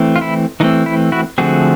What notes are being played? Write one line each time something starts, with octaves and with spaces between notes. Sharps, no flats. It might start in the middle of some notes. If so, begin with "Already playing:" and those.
Already playing: E3 A3 C4
F4
E4
E3 A3 C4 D#4
E4
E4 F#4
D3 F3 A3 C4 F#4 G#4